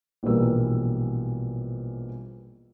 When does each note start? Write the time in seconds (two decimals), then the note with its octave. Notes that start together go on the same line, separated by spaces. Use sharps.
0.23 A#1 B2 E3 G3 A#4 E6